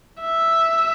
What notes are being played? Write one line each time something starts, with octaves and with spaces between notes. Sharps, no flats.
E5